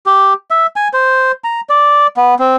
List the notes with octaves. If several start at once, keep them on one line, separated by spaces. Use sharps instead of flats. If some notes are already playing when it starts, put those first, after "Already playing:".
G4
E5
G#5
C5
A#5
D5
B3
C4